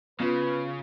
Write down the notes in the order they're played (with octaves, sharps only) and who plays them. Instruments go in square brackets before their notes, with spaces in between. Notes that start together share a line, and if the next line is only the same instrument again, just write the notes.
[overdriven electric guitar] C#3 [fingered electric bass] B3 [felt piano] F4 [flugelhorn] B4